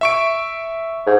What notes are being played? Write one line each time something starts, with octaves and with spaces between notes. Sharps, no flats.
E5 C#6 D7
G#2